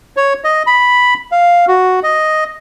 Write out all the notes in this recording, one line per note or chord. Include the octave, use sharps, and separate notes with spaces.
C#5
D#5
B5
F5
F#4
D#5